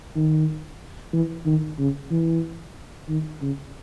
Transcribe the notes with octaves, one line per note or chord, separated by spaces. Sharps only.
D#3
E3
D#3
C#3
E3
D#3
C#3